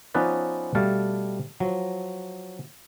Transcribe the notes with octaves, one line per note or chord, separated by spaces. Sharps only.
F3 B3 C#4 D#4 B4 D5
B2 G3 A3 F5 A5
F3 F#3